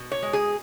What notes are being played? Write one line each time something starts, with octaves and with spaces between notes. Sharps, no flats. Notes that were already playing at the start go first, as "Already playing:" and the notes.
Already playing: B2
C#5
G#3
G#4